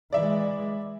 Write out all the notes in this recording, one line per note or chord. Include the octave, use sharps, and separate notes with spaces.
E3 G#3 D5 E5